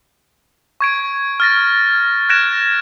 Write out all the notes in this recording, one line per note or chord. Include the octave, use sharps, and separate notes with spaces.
C#6 G#6 D7
F6 A6 A#6
F#6 G#6 A#6 D7 E7